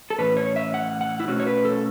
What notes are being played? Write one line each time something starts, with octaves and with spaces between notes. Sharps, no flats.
A4
A2 E3 C#4 B4
C#5
E5
F#5
F#5
E4
B2 A3 C#4 F#4
C#5
B4
A4